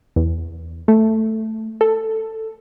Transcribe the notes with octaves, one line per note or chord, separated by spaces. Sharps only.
E2
A3
A4